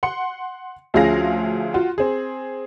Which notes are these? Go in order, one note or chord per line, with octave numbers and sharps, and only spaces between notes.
F#5 C6 C#7
D2 F3 C#4 G#4 F5 A#6
F4 F#4
C4 G#4